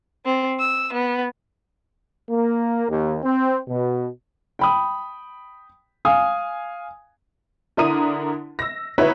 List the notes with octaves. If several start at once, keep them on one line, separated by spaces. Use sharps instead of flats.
C4
E6
B3
A#3
D#2
C4
B2
G5 B5 D#6
F5 G#5 D#6
D3 D4 E4 A#4 D#6 D#7
E6 A#6
D#4 E4 F#4 B4 C#5 E5